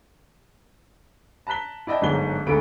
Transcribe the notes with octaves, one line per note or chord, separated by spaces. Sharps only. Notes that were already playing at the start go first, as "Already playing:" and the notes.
A5 A#5 F#6 B6 G7
E4 D5 D#5 G5 A5
G1 G#2 F#3 G#3 G7
D2 G#2 A3 A4 B5 D7